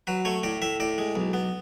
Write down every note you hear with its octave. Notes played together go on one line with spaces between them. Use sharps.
F#3 B4
A3 C#5
A2 D5
A2 E5
A2 D5
G#3
B1
B3